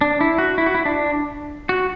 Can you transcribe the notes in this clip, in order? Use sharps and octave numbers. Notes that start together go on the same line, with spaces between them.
D4
E4
F#4
E4
F#4
E4
D4
F#4